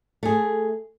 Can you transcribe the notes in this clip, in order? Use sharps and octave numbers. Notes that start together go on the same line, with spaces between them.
A3 G#4